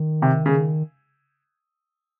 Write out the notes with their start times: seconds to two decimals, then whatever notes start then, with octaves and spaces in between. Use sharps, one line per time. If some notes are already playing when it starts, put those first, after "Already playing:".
Already playing: D#3
0.22 C3
0.46 C#3